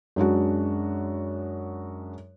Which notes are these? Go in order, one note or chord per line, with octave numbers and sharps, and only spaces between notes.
F#2 G#3 D4 F#4